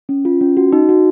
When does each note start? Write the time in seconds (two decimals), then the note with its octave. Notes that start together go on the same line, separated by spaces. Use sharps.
0.09 C#4
0.25 F4
0.41 C#4
0.57 F#4
0.73 D#4
0.89 F#4